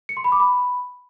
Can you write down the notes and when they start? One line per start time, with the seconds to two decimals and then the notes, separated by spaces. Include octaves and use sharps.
0.09 C#7
0.17 C6
0.24 B5
0.32 D6
0.40 B5